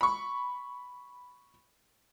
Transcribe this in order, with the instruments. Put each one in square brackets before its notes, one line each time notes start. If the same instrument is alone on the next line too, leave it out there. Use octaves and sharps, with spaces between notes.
[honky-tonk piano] B5 C#6